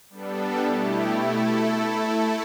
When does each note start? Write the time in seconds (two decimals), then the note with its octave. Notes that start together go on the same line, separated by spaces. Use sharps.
0.10 G3 B3 D4 A4
0.59 B2 A3 E4 G4
1.09 A3 E4 A4